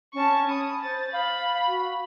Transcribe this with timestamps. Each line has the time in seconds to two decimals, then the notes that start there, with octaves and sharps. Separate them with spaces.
0.14 C#4 A5 C#6
0.48 B5 D#6
0.83 C5 A6
1.12 F5 B5
1.67 F#4